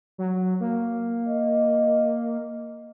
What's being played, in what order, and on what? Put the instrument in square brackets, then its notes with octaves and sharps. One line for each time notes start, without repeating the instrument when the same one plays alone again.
[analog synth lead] F#3
A#3
[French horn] D#5